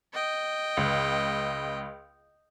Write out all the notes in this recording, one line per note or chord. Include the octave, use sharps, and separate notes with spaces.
D#5 G5
C#2